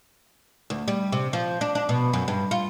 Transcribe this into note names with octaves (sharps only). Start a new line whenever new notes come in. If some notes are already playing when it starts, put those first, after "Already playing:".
D2
G3
C3
F3
D4
D4
B2
F#2
G2
F4